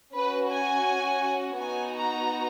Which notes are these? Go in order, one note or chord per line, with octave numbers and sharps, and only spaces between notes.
C#4 F#4 B4
G#5
B3 D#4 F#4 G#5
A#5